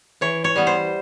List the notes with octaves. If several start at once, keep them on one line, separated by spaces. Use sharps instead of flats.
E3 C#5
C#5
G3 B3
C5